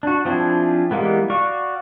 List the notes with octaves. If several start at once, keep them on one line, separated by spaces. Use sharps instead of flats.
D4 F#4
F3 C4 D4 E4 G#4
E3 G3 G#3 A#3 B3
F#4 D5 F5 C#6